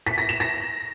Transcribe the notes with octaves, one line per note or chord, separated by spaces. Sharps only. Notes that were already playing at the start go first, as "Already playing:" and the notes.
B6
A#6
E7
A#6